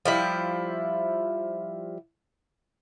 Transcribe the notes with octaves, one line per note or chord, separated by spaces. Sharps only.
F3 G3 E4